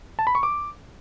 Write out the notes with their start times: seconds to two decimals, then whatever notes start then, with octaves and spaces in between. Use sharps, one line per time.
0.19 A5
0.27 B5
0.35 C#6
0.43 D6